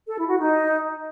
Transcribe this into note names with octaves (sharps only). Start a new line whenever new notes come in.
A4
E4
F#4
D#4